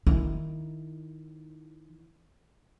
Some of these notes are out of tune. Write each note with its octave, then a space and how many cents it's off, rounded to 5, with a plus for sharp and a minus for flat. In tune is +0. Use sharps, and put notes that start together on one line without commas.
D#3 +0 E4 +0